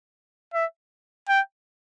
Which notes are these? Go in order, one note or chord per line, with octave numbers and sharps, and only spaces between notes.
E5
G5